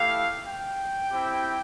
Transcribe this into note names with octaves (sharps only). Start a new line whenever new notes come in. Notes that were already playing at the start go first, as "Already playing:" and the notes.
Already playing: A3 E4 G4 F5
G5
C4 E4 G4